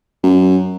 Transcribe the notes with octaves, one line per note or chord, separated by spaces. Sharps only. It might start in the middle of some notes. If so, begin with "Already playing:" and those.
F#2